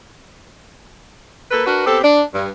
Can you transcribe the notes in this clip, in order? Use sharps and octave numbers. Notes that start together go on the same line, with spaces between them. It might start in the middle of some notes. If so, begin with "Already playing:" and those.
A#3 A4 B4
D4 F#4 A#4 B4
B3 C4 G4 A4
D4
G2